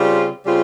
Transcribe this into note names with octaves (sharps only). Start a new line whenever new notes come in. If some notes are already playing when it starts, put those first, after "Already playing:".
Already playing: C#3 G3 C4 F4
C#3 G3 C4 F4